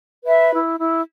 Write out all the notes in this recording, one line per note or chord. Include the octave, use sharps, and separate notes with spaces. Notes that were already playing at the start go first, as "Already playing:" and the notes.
B4 E5
E4
E4